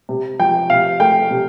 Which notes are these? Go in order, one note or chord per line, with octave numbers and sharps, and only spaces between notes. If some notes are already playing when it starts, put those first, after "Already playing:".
C3
F3 G5
C3 F5
A3 G5
C3